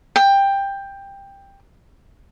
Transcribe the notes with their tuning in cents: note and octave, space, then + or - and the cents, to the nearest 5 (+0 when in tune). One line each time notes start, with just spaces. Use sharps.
G5 +15